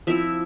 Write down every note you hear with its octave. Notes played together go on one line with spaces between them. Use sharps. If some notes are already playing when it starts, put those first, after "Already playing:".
F3 C4 E4 E5